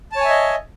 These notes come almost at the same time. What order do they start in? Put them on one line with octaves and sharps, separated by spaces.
A5 C#5 G#5 E5 D#5